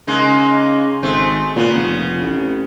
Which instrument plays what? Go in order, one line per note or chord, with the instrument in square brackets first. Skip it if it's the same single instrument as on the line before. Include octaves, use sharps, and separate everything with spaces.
[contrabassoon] C#3 [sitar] G#3 A#3 D#4
[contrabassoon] G#1 [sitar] G#3 A3 C4
[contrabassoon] A#2 [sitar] C#3 B3
[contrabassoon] F1
A1